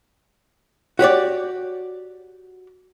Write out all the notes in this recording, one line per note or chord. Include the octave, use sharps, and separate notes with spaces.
F#4 G4 C#5 D5